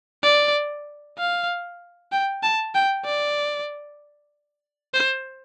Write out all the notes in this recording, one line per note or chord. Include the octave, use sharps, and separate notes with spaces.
D5
F5
G5
A5
G5
D5
C5